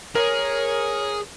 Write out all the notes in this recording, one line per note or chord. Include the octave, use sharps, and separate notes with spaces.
G#4 A#4 C#5